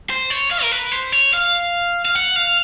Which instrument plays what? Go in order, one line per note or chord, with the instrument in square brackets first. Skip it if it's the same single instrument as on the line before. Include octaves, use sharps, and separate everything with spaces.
[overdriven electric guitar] C5
C#5
F5
A#4
B4
C5
C#5
F5
F5
F#5
F5